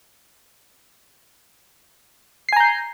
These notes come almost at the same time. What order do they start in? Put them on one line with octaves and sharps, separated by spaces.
C7 G#5 A#5 G6